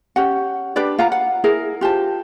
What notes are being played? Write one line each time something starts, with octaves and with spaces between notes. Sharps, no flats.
C#4 G4 F#5
D4 G4 B4 D5
F4 F5 F#5 A#5
F#5
E4 G#4 A#4
F4 G4 C5 A5